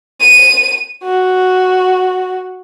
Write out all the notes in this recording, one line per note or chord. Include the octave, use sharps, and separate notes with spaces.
D#7
F#4